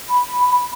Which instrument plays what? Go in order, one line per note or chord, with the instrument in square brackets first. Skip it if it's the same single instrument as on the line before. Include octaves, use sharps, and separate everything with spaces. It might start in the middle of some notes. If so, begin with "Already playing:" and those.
[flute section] B5